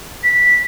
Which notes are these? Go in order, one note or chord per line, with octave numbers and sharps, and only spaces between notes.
B6